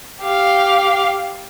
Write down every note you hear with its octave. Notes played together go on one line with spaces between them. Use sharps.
G4 F5